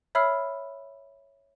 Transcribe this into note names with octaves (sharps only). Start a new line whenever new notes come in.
C#5 E5 B5 E6 F6 C7